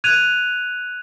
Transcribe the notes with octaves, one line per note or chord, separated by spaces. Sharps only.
F#6 G#6 D#7 F7